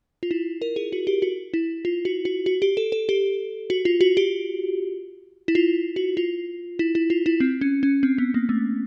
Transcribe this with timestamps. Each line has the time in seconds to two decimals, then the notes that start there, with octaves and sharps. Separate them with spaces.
0.23 F4
0.31 E4
0.62 A#4
0.76 G#4
0.92 F#4
1.07 G4
1.22 F#4
1.54 E4
1.85 F4
2.05 F#4
2.25 F#4
2.46 F#4
2.62 G4
2.77 A4
2.92 A4
3.09 G4
3.70 F#4
3.85 F4
4.01 F#4
4.17 G4
5.48 E4
5.55 F4
5.96 F#4
6.17 F4
6.79 E4
6.95 E4
7.10 F4
7.26 E4
7.40 C4
7.61 C#4
7.83 C#4
8.03 C4
8.18 B3
8.34 A#3
8.49 A3